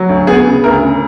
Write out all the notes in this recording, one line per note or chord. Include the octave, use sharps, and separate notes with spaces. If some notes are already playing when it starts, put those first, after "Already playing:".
Already playing: F#3
D2
B3 G#4
C#3
D2 A#4
C#3